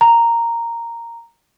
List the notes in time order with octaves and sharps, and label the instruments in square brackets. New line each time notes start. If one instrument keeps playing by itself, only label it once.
[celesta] A#5